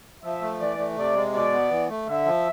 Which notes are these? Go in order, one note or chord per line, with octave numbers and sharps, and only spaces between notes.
F3 E5
A3
E3 D5
A3
C3 D5
G#3
B2 D5
B3
E3
A3
D3 E5
F3